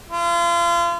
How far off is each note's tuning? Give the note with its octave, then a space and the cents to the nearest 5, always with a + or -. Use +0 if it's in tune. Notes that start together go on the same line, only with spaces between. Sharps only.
F4 -35